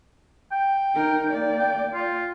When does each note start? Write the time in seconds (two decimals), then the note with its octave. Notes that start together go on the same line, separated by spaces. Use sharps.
0.52 G5
0.95 D#4 A#4
1.30 A#3 D5
1.59 G5
1.94 F4